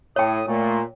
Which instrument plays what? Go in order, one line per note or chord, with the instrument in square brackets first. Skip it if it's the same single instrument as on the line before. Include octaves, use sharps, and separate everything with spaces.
[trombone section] A2 [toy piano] C#5 G5 [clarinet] D#6
[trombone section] A#2 [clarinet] A3